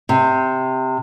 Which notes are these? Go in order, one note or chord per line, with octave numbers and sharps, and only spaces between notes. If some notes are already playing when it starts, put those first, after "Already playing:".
C3